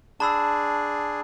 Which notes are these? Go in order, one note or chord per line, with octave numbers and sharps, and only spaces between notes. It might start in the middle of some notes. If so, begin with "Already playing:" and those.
D4 G#4 A5 B5 E6